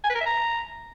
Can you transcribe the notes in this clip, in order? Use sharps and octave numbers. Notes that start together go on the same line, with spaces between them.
G#5
B4
A#4
E5
A#5